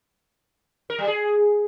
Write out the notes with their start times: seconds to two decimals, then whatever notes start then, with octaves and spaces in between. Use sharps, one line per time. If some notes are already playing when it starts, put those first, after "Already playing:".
0.90 A#4
0.99 G3
1.07 G#4